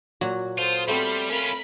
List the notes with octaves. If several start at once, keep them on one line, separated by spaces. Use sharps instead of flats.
A#2 F#3 F#4
F4 A4 C5 D#6
G3 A3 B3 C4 B5 C6 F6
C#4 F4 A#4 B5